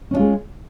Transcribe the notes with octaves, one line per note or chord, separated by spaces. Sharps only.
G#3 C#4 D4 F4